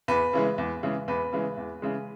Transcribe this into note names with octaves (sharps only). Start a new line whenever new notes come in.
E2 B4
C#3 E3 G#3
E2
C#3 E3 G#3
E2 B4
C#3 E3 G#3
E2
C#3 E3 G#3